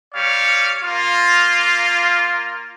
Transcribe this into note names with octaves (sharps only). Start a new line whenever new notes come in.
G3 C#5 F5
A#3 F4